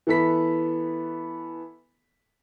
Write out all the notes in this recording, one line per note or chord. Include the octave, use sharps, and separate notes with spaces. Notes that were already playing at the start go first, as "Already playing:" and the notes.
E3 B3 A4 B5 B6